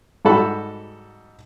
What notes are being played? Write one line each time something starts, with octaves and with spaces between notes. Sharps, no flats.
G#2 G3 F#4 A4 B5